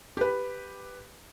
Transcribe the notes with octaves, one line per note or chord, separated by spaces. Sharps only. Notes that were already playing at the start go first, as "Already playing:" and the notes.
G4 B4